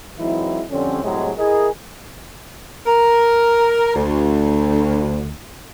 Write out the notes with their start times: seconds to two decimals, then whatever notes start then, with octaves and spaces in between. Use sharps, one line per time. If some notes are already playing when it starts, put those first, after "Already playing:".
0.19 E3 F#3 G#3 C4 D#4 E4
0.71 F2 D3 G3 C4 C#4
1.03 C2 A2 C3 F#3 G#3
1.38 E4 G#4 A#4 D#5
2.86 A#4
3.95 D2